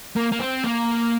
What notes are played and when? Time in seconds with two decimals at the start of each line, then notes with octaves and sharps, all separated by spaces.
0.16 A#3
0.32 A#3
0.40 C4
0.64 A#3